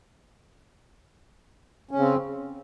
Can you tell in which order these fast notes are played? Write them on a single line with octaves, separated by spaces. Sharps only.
C#4 C#3 C4